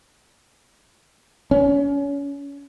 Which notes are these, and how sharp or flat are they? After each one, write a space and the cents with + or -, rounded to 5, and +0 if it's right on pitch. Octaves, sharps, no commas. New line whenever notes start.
C#4 +30